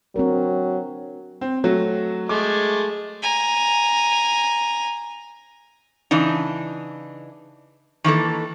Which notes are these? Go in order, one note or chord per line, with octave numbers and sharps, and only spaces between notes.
F#3 C4 D4 A#4
C4
F#3 A3 F#4
G#3 A3 D6
G#5 A#5
C#3 E3 D4 D#4
D#3 E3 A#3 A4